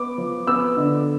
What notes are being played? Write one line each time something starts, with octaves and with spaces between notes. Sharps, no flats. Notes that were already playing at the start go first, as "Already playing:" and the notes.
Already playing: B3 D6
F3
B3 E6
D3